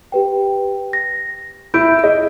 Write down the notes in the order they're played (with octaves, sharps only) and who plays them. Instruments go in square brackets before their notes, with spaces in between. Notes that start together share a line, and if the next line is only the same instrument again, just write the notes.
[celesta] G4 B4 G5
A#6
[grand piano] E4 [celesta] G6 D7
[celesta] G#4 [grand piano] D#5